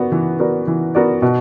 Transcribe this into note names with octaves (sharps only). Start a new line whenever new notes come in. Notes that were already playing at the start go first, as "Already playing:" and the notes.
Already playing: B3 F#4 A#4 D5
E3
B3 F#4 A#4 D5
E3
B3 F#4 A#4 D5
B2